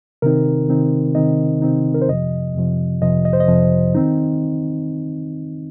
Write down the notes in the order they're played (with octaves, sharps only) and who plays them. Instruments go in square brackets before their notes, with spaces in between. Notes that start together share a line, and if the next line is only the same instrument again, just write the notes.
[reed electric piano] C3 D#3 C4 D#4 A#4
C3 D#3 C4 D#4
C3 D#3 C4 D#4 D#5
C3 D#3 C4 D#4
A#4
C5
F2 C3 F3 D#5
F2 C3 F3
F2 C3 F3 D#5
D#5
C5
D#5
F2 C3 F3
D#3 C4 D#4